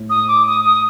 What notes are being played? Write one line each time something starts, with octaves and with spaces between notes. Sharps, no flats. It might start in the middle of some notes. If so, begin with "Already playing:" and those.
Already playing: A2
D#6
D6
D#6
D#6